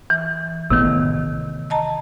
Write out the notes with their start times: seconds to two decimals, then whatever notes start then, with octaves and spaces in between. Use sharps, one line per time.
0.10 E3
0.70 A1 A2 C3 D#3 B3
1.70 D#5 A5 A#5